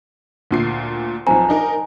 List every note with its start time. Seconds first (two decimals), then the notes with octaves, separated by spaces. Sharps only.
0.51 D2 A#2 C7
1.27 B1 F3 C4 G#5 A#5
1.49 D4 D#4 A#4